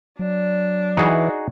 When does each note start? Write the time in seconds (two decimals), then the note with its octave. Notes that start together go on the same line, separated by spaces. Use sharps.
0.19 F#3 D4
0.97 E3 D#4 F#4 G#4